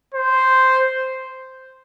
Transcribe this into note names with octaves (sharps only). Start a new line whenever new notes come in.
C5